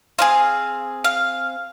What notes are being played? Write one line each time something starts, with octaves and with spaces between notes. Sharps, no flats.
C4 D#4 G#4 F5
F5